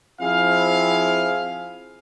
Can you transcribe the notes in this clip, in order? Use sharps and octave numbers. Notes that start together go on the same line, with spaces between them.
F3 C4 E4 G#4 F5